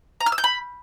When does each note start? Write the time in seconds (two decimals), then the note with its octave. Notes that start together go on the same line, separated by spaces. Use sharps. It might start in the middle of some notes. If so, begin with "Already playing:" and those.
0.21 A#5
0.26 F6
0.32 E6
0.38 G6
0.44 B5